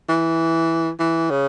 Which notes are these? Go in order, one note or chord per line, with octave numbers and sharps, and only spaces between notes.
E3
E3
C#3